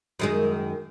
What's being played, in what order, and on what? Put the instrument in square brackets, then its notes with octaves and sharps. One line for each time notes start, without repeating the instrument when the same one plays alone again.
[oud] F#2 D#3 G#3